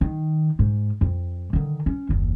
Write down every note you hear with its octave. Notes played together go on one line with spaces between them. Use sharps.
D#3
G#2
F2
D3 D#3
C#4
F#1 D#2